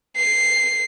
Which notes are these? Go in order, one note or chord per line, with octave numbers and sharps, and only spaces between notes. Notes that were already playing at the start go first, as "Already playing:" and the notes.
C7